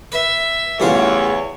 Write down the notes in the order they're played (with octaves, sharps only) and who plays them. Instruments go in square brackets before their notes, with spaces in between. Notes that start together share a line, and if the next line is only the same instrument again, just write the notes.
[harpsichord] B4 [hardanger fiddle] E5
[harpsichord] A1 C#3 C5 [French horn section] E2 [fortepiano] E3 G3 F4 [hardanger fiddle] C#5